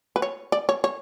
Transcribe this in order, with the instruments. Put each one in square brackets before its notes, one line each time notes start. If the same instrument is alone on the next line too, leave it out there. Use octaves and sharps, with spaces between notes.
[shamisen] B4
C#5
D5
C#5
C#5